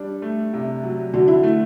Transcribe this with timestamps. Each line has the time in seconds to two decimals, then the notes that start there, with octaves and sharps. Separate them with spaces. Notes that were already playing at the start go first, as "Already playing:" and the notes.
Already playing: G3 D4
0.22 A3
0.53 C3
0.83 F#3
1.13 D3 F#4
1.28 E4
1.43 A3